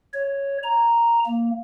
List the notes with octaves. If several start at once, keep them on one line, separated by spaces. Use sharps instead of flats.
C#5
A#5
A#3